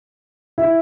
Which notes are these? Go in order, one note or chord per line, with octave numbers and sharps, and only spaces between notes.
E4